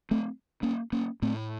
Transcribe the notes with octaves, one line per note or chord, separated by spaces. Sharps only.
A3 C4
A#3 C#4
A#3 C#4
A2 A3 C4